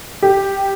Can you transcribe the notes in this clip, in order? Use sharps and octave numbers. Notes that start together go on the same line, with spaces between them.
G4